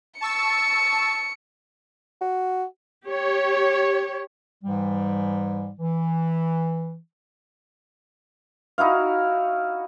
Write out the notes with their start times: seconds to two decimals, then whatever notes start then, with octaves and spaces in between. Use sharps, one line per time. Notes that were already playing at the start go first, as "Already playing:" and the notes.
0.21 A5 C#6 E6 C#7
2.21 F#4
3.06 G4 C#5
4.64 G#2 E3 G3
5.80 E3
8.78 D#4 E4 F#4 F5